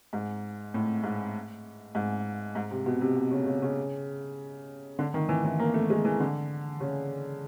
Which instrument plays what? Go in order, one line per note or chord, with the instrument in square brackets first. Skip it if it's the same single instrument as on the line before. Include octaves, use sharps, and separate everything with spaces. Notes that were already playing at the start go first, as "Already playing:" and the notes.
[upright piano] G#2
A2
G#2
G#2
G#2
C3
B2
C3
B2
C#3
C#3
C#3
D3
D#3
E3
E3
A#3
A3
G#3
E3
D3
C#3